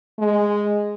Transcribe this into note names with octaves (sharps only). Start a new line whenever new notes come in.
G#3